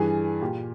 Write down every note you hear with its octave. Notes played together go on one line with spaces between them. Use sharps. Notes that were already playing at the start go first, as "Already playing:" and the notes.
Already playing: G2 E3 G#4
A#2 G4